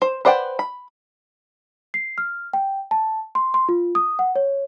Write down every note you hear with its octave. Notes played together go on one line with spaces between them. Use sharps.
C5
B4 C5 D5 F#5 G5
B5
C7
F6
G5
A5
C6
C6
F4
D#6
F#5
C#5